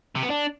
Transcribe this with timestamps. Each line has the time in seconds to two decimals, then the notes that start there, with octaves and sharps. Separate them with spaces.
0.16 C3
0.23 B3
0.30 D4